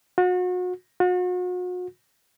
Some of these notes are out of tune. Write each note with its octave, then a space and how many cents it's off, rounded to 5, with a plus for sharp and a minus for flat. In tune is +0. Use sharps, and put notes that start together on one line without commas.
F#4 -35
F#4 -40